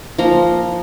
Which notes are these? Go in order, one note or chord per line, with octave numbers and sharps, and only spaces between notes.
F3 A#3 A#5 C6